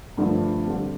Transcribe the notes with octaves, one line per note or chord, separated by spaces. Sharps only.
G2 D3 F3 A3 D4
D3 G3 C4